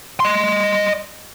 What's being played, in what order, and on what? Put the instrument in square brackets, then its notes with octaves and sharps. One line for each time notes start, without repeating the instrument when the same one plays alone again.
[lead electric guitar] D#5 C6